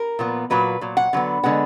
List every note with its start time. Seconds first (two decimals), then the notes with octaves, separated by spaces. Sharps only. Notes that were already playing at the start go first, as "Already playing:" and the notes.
Already playing: A#4
0.19 A#2 F3 B3
0.50 A#2 F#3 A#3 B4
0.81 A#2 F#3
0.97 F#5
1.13 D3 F#3 B3
1.43 D3 G#3 B3 F#5